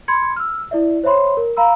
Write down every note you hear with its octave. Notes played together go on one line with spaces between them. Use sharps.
B5 C6 G#6 C#7
E6 F6
E4 D5 E5
C5 C#5 E5 B5 C6
A#4
F5 A#5 B5 E6